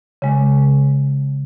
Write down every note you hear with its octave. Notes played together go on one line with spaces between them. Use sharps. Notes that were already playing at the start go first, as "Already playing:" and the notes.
C#3 G#3